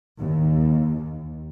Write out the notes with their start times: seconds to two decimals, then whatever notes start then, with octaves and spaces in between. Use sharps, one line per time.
0.19 D#2